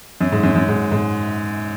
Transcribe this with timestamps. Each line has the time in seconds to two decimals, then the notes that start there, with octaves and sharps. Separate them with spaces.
0.21 F#2
0.32 G#2
0.43 F#2
0.56 F#2
0.68 G#2
0.92 G#2